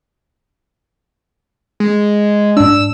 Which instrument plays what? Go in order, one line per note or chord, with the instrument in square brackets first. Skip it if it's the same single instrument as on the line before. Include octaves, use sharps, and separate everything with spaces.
[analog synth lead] G#3
[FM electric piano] G#2 D4 [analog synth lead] E6